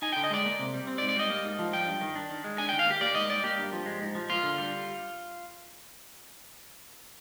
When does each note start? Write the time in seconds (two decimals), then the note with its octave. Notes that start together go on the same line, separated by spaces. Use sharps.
0.02 D#4 G#5
0.13 D3 G5
0.24 D#5
0.30 G#3 D5
0.45 A#3
0.59 C3
0.74 G3
0.87 C4
0.98 D5
1.01 G#2
1.09 D5
1.16 G3 D#5
1.30 A#3
1.44 G#2
1.59 F3
1.73 G3 G5
1.87 G2
2.01 D#3
2.15 D4
2.30 D#3
2.44 G#3
2.58 D4 G#5
2.69 D#3 G5
2.79 F5
2.86 A#3 G4
3.01 A#3 D5
3.15 G#2 D#5
3.29 G3 D5
3.44 A#3 G4
3.58 G2
3.72 F3
3.86 G#3
4.01 G#2
4.15 F3
4.29 A#3 F4
4.43 D3
4.58 G3